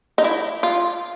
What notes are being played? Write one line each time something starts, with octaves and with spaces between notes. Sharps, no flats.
D#4
E4
F4